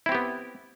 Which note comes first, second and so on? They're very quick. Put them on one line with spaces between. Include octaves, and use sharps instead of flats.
E4 C4 G4 B3